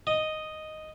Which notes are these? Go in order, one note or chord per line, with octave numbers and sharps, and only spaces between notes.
D#5